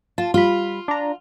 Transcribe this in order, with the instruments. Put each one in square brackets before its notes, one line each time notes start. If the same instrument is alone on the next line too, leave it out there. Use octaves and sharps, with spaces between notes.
[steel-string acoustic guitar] F4 [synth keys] A5
[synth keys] G3 B5 [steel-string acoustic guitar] F4
[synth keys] D4 A#5